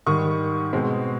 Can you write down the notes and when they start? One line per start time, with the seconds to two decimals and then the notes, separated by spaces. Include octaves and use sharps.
0.06 G#2 D#3 G3 C#6 D#6
0.73 B2 G#3 C4